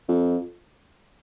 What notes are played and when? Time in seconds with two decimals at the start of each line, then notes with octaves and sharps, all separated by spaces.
0.09 F2